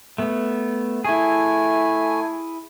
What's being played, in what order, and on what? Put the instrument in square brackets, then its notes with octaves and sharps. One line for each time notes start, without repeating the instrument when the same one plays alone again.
[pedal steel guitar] A3 B3
[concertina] A3 G#5 [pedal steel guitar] E4 G#4